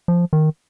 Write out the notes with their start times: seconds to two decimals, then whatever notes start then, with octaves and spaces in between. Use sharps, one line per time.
0.08 F3
0.33 D#3